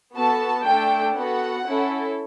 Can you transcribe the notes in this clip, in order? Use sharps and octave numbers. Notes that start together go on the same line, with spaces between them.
B3 F#4 A4 A5
A3 D4 A4 G5
B3 F#4 A4 F#5
C#4 E4 A4